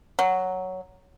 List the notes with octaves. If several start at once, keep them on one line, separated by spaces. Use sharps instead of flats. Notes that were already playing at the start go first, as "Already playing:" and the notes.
F#3